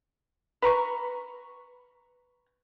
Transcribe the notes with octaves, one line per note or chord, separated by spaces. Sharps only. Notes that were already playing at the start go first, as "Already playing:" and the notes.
B4 A#5 C#6